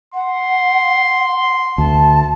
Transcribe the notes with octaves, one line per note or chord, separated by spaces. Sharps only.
F#5 C6
D2 A5